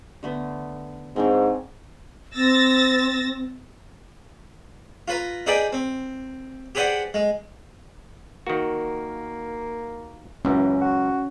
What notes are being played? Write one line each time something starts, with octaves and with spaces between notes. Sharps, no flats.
D3 A3 B3
G#2 C4 D4 C#5
C4 E6 A6 A#6
F4 B4 A#5
D#4 G#4 B4 D5 G5 G#5
C4
G4 G#4 B4 C5 D5 F#5
G#3
D#3 A#3 F#4
C#2 F#2 E3 C#4
F#4